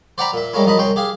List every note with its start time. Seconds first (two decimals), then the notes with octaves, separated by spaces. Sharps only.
0.18 C5 D5 F#5 G5 A#5 B5
0.34 A#2 E5
0.54 G3 G#3 A#3 C#4 E4
0.65 F#2 F3 D#4 D#5 B5
0.78 C2 C#4 G5 C6
0.96 G4 G#4 F5